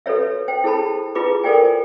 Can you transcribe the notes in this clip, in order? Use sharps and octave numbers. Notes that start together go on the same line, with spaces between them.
F#4 A4 B4 C#5 E5
C5 G5
E4 G#4 A4 C5 A5 B5
E4 F4 G#4 B4 B5 D6
A4 A#4 C5 D5 G5 G#5